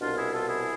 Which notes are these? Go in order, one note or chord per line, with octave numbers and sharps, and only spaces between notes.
C2 B2 D4 F4
E4 G#4
F4 A4
E4 G#4